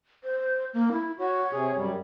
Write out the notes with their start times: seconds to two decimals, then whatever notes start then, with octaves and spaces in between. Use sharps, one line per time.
0.24 C5
0.74 A#3
0.92 E4
1.19 F#4 C#5
1.53 C3 G#4
1.76 F#2 G3